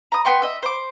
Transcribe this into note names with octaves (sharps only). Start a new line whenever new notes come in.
A#5 D#6
B3 G5 C6 C#6
D#5 E5
C5 D6